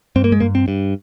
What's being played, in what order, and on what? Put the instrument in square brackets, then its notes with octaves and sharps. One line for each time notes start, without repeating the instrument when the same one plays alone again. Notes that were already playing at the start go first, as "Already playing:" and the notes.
[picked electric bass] G2 C4
A#3
G#3
G2 A#3
C4
G2